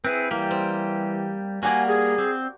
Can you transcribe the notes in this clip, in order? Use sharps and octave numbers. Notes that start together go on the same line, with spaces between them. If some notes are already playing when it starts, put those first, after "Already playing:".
C4 E4 G#4 B4
E3 G3 A#3 G4
C4
G3 A#3 F#4 G4 D5 G#5
G#4
C4